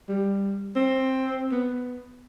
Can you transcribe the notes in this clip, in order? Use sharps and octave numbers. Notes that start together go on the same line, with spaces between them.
G3
C4
B3